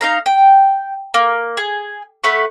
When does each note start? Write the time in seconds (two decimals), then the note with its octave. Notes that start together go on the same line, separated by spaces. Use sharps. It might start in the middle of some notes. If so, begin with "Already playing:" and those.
0.01 D#4 F5 A#5
0.26 G5
1.14 A#3
1.57 G#4
2.24 A3 B4 F#5 C#6